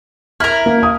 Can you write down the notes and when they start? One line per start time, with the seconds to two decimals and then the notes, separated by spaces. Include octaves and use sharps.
0.40 E4 A#4 F6
0.66 A#3
0.80 F5 D#6